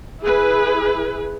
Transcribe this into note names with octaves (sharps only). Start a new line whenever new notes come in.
E4 G#4 B4